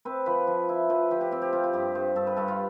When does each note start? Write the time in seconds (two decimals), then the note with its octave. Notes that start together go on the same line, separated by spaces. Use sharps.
0.05 C4 B4
0.26 F3 B4
0.47 F3
0.69 E4
0.89 F3 B4
1.11 F3 G4
1.21 G4
1.31 C4 G4
1.42 G4
1.53 C4 F4
1.64 F4
1.73 G2 G4
1.95 G2 C5
2.16 G2 A4
2.27 B4
2.36 G2 A4
2.48 F4